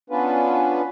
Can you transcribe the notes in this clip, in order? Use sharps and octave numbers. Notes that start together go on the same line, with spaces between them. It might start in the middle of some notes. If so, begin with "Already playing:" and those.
B3 C#4 D4 F4 B4